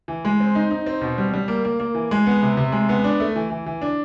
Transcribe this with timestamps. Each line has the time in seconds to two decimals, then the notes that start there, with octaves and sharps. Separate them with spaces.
0.08 E3
0.25 G#3
0.40 C4
0.55 D#4
0.70 D#4
0.86 C4
1.01 B2
1.18 G3
1.34 G3
1.48 A#3
1.65 A#3
1.80 A#3
1.95 E3
2.11 G#3
2.26 B3
2.42 C3
2.57 C3
2.72 G#3
2.89 B3
3.04 D4
3.20 A3
3.36 E3
3.50 E3
3.66 E3
3.82 D4